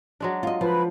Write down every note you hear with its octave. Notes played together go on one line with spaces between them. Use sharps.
F#3 G#3 D4
F4 D#5
F3 B4 B5